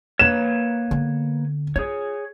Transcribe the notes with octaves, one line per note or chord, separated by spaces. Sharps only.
A#3 B4 C#5 E7
D3 B3
F4 G#4 C#5